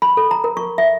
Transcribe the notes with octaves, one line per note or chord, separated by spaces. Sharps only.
B5
A4
A#5
A#4
C#6
E5